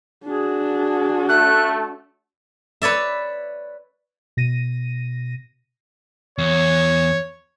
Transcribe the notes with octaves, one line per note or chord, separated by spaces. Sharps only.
D4 F#4 G#4
A3 F#6
B4 C#5 D5 E5
B2 A#6 D#7
E2 C#5